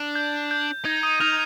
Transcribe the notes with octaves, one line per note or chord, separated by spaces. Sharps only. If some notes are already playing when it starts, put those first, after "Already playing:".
Already playing: D4
G6
G6
D#4 G#6
D#6 D#7
D#4 F6 F7